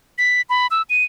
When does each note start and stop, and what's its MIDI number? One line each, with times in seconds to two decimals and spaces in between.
0.18 0.41 95
0.50 0.67 83
0.71 0.82 88
0.90 1.04 99